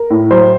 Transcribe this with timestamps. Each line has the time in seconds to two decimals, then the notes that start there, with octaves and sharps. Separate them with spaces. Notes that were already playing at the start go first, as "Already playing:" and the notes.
Already playing: A#4
0.10 A2
0.31 F#3 C5